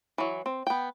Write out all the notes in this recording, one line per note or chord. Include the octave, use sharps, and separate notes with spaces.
E3 F#3
C4
B3 G5